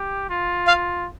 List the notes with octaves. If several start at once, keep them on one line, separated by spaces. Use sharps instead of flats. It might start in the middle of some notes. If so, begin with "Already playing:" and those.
Already playing: G4
F4
F5